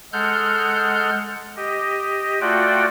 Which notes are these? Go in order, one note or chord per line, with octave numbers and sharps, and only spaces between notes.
G#3 A4 F#5 F6 G6
G4 D#5
A3 F4 F#4 D5 F#5 G5